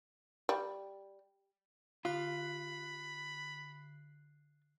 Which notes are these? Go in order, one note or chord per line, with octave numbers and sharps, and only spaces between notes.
G3
D3 F4 B5 F#6 C7